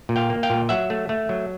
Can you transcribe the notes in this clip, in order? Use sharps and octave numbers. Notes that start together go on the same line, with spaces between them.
A#2
F5 G5
A#3
F5 G5
A#2
F#3 E5 F#5
A3
A3
F#3